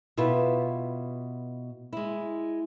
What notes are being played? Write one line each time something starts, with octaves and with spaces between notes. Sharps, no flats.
B2 E4 F4 G4 B4
G#3 E4